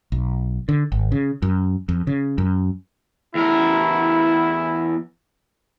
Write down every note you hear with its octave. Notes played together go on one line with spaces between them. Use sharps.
B1
D3
G#1
C#3
F#2
F2
C#3
F#2
E2 E4 A#4